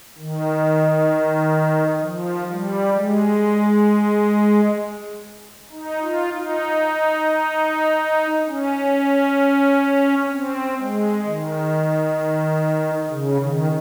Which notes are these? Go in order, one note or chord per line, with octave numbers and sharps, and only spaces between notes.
D#3
F3
G3
G#3
D#4
F4
D#4
C#4
C4
G#3
D#3
C#3
D#3